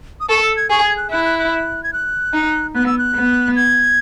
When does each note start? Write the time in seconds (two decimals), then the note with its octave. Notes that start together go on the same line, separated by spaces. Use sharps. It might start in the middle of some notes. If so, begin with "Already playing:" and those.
0.20 D#6
0.29 A4 C#6
0.43 E6
0.57 G#6
0.70 G#4 C#6
0.84 G#6
0.97 F#6
1.11 E4 F#6
1.25 F#6
1.39 F#6
1.84 G#6
1.93 F#6
2.34 D#4
2.75 B3 F#6
2.86 E6
2.98 F#6
3.16 B3
3.56 G#6